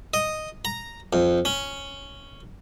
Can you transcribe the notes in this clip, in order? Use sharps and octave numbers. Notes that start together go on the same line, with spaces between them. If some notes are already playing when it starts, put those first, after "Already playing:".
D#5
A#5
F2
C#4